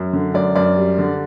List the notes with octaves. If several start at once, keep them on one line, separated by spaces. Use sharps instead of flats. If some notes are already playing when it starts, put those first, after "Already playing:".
Already playing: F#2
D3
F#2 D5
F#2 D5
G3
D3